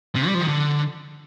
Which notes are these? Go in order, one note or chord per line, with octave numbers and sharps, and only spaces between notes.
C3
G3
F3
D#3
D3